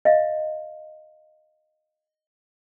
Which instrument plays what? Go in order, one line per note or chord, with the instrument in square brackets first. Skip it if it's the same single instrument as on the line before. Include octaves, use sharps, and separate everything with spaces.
[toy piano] D#5 F5